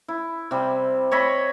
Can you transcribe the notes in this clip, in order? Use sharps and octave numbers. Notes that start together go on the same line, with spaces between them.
E4
C3 G3
C#5 D#5 E5 B5